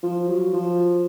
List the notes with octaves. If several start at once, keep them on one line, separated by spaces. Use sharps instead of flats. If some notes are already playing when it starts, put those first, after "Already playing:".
F3
F#3
F3